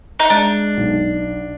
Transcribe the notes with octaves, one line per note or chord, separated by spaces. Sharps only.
D#4
G#3 D4
B1